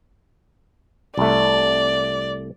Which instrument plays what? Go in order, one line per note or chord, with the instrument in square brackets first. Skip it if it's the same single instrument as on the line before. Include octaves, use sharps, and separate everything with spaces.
[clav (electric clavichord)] C2 A3 [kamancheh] D5